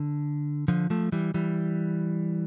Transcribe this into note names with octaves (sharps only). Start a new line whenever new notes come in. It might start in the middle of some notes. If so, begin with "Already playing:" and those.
Already playing: D3
D3 F3
F3 A3
E3 G3
E3 G3